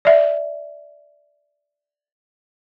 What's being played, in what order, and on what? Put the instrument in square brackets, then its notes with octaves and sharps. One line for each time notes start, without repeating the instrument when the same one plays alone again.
[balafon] D5 E5